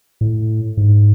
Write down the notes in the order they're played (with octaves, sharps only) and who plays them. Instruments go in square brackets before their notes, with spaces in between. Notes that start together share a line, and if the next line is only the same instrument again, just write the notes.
[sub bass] A2
G#2